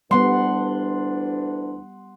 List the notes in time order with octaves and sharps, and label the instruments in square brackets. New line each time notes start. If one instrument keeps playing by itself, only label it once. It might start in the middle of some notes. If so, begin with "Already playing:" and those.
[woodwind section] D2 E3 D4 [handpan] G3 B3 [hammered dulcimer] F#5 C6